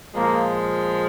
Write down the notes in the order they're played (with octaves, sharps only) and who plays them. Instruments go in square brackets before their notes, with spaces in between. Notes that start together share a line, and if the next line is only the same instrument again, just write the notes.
[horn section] A#2 F3 G#3 A#3